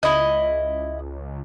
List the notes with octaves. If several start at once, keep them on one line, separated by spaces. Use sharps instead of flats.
C#2 E4 D#5